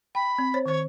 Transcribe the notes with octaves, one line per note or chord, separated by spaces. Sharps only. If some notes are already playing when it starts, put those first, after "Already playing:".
G5 B5
C4
C5 C#5
D#3 C5 C#5